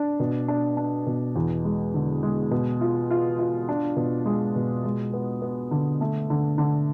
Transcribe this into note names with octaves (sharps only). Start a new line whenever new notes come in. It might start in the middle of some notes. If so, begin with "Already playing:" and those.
Already playing: D4
B2
D4
D4
B2
E2
G#3
D3
G#3
B2
F4
F4
F4
D4
B2
G#3
B2
G#3
B3
B3
D3
A3
D3
D3